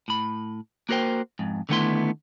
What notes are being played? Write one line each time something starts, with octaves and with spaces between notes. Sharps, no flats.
A2 B5
A#3 F#4 A#4 C5 G5
F2 G#2
D3 D#3 A3 B3 E4 C6